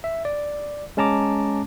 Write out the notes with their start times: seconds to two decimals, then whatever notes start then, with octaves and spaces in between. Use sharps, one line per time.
0.04 E5
0.25 D5
0.97 G#3 C#4 A5 A#5 D6